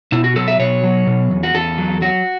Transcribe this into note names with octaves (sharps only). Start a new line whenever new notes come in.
B2 E4
F#4
F#3 A4
E5
B2 C#5
F#3
B2
E2
F#4
E2 A4
F#3
F#3 F#4